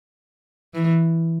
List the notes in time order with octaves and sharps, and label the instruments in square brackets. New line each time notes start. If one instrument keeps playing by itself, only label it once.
[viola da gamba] E3